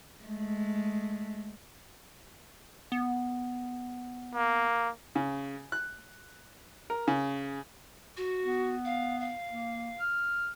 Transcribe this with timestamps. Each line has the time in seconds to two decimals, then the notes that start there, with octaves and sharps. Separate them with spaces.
0.23 G#3 A3
2.92 B3
4.35 A#3
5.15 C#3
5.72 F#6
6.90 A#4
7.08 C#3
8.17 F#4
8.44 B3
8.85 F5
9.20 F5
9.51 A#3
10.00 F6